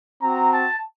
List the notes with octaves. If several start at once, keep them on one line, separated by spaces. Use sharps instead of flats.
C4 F#4 A#5
A5